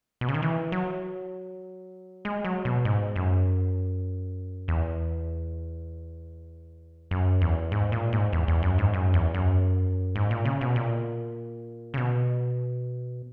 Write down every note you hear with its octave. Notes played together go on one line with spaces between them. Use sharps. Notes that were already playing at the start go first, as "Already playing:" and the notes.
B2
C#3
D#3
E3
F#3
G#3
F#3
B2
G#2
F#2
E2
F#2
E2
G#2
A#2
G#2
E2
E2
F#2
G#2
F#2
E2
F#2
G#2
A#2
C#3
B2
A#2
C#3
B2